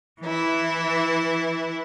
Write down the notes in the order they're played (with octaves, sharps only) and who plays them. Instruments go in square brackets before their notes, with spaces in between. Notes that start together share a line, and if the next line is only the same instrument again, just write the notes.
[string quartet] E3 E4